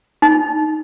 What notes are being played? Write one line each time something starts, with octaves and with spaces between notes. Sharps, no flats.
D#4